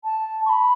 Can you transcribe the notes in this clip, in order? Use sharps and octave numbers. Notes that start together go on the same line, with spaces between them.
A5
C#6
B5